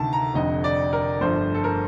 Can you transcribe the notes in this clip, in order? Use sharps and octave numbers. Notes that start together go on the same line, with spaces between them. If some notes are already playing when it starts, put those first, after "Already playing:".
Already playing: D2 C3 D#3 A5
A#5
F1 F2 D3 D#5
D5
A#4
G1 G2 F3 A3 C5
A4
A#4